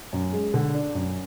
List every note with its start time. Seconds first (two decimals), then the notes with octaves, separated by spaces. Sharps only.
0.13 F#2
0.33 G#3
0.54 D3
0.74 D4
0.95 F#2